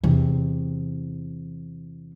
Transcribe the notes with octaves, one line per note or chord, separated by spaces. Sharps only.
E2 C3